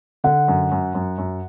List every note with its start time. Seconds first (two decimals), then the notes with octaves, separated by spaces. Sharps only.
0.24 D3 F#5
0.48 F#2
0.71 F#2
0.95 F#2
1.18 F#2